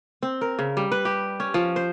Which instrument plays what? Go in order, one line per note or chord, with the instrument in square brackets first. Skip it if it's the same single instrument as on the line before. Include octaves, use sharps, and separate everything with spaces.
[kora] C4
A#4
C#3
G3
B4
G4
C#4
F3
C5